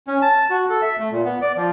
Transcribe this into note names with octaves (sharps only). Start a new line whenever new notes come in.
C#4
A5
F#4
A4
E5
A3
A#2
B3
D5
F3